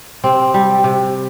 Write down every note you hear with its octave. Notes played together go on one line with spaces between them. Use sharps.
C3 C4
G3
C3